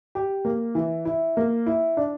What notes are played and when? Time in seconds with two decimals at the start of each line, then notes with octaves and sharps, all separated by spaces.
0.15 G4
0.45 A#3
0.75 E3
1.05 E4
1.37 A#3
1.66 E4
1.97 D4